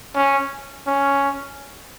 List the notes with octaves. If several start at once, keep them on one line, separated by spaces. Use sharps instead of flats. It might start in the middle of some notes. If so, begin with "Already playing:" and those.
C#4
C#4